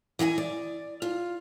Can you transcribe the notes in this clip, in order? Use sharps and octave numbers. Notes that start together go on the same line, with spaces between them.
E3 D#5 F#5 G#5
D5
F4